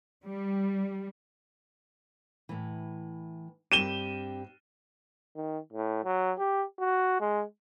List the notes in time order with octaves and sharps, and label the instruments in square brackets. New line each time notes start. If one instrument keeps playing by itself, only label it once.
[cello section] G3
[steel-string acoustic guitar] A2 E3
[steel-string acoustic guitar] G2 C4 G4 [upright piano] D#7 E7 G7
[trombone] D#3
A2
F#3
G4
F#4
G#3